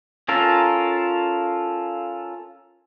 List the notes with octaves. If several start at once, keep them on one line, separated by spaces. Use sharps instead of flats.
C#4 F4 A4 A#4